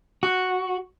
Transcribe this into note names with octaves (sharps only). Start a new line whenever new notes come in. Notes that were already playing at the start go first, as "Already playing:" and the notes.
F#4